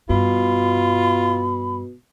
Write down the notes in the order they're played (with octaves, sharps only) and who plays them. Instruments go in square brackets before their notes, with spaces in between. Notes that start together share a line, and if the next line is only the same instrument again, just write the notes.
[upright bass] G2 [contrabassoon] B2 [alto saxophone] F4 [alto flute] B5